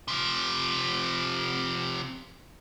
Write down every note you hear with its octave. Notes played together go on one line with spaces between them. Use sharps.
C3 F3